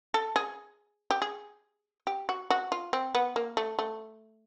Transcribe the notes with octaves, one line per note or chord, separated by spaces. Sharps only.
A4
G#4
G4
G#4
G4
F#4
F#4
F4
C4
B3
A#3
A3
A3